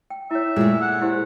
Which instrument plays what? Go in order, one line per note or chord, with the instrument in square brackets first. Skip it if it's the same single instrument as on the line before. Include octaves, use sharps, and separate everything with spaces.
[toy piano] G5
[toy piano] E4 C#5 [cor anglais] E5
[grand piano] A#2 [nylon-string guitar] G#3 A3
[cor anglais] F#5
[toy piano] E4 G4 C5